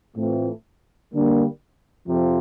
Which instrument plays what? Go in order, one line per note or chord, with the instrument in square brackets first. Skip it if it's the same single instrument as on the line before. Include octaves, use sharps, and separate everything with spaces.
[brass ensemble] A2 E3 A3 C4 F4
D3 G3 A#3 D4
F2 C3 F3